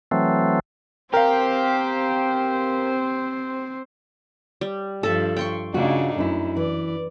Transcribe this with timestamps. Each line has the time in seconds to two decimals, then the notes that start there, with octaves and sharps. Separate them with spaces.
0.11 E3 F#3 A3 C4
1.14 C4 G4 A#4 C5 F5
4.61 G3
5.03 G2 F3 A4 E5
5.37 G5 C6 C#6
5.74 C#3 A3 D4 D#4 F4 F#4
6.18 F#2 D#4 E4
6.56 E3 D5